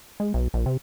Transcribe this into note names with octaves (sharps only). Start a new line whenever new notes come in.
G#3
B1
A#1
C3